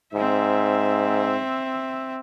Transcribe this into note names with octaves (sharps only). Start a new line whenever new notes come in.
G#2 C4 E5